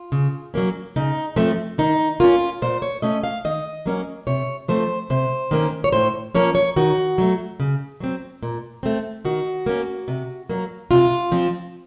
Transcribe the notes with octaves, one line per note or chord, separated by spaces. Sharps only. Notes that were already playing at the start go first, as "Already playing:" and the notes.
Already playing: F4
C#3
F#3 A#3 C#4
C#3 D#4
F3 A3 C4 C#4
D#3 D#4
A#3 C#4 F4
A#2 C5
C#5
A3 C#4 D#5
F5
D#3 D#5
F#3 A#3 C#4
C3 C#5
F3 A3 C4 C5
C3 C5
D#3 A#3 C#4
C#5
A2 C5
F3 A#3 C#4 C#5
C#5
D#3 F#4
F#3 A3
C#3
F#3 C4
A#2
A3 C4
D#3 F#4
A#3 C#4
C3
F#3 A#3
C3 F4
F3 C4